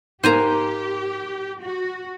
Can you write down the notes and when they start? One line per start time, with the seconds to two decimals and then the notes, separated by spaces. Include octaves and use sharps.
0.23 G#2 A#3 G4 C5 G#5 A#5
1.63 F#4